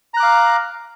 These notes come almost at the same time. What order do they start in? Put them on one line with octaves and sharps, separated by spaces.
A#5 F#6 D6 F5